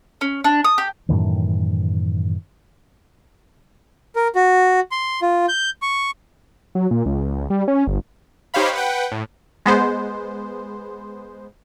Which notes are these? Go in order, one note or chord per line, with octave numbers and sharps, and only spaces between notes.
C#4
D4
D#6
G4
F#2 A2 D#3 E3
A#4
F#4
C6
F4
G6
C#6
F#3
A#2
C#2
G3
C#4
G1
D#4 G4 C5 C#5 F5 B5
B4 F#5 G5
A2
G#3 B3 C5